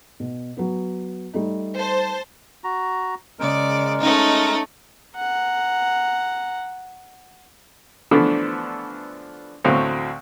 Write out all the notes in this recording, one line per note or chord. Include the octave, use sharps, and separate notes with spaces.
B2
F#3 B3
G3 A3 D#4
C5 A5
F#4 A#5
C#3 G#3 A#4 D5
A3 C#4 D#4
F#5 A#5
D3 E3 F3 A3 B3 D4
D2 A2 F#3 C4 F5